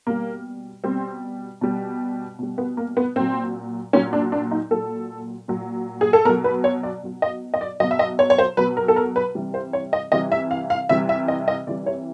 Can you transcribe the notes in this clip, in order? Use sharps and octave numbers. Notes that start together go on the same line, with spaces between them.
B2 G3 A#3
B2 G3 C4
B2 G3
B2 G3
B3
A#3
B3
A#2 F#3 C4
A#2 F#3 C#4
D4
D4
D#4
A#2 F#3 A4
A#2 F#3
G#4
A4
B2 F#3 A#4
B4
C#5
D5
B2 F#3
D#5
D#5
D5
B2 F#3 D#5
E5
D#5
C#5
C#5
C5
B2 F#3 B4
A#4
A4
A#4
B4
C3 E3 G3
C5
C#5
D#5
C3 E3 G3 D#5
E5
F5
F5
C3 E3 G3 E5
E5
D#5
D#5
C3 E3 G3 D5
C#5